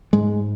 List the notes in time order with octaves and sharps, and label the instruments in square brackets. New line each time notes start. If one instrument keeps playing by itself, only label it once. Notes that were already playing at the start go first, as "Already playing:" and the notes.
[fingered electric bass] G#2 G#3